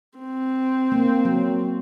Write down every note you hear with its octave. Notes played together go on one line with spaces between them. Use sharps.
C4
A#3
F#3